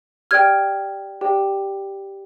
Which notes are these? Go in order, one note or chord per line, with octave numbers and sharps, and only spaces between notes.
G4 D5 G5 F6 G#6
G4 D5 G5